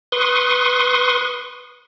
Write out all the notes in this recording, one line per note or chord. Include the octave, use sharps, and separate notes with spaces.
B4 C6 C#6 D#6